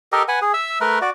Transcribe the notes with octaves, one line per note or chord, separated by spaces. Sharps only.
G4 A4 A#4 D#5
B4 F#5 G#5
G#4
E5 E6
A3 A#4 B4
F#4 D5